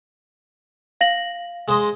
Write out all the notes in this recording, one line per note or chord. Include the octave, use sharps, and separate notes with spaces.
F5 A#6 F#7
G#3 C5 D#5